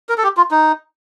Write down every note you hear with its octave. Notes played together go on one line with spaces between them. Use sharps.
A#4
A4
G4
F4
D#4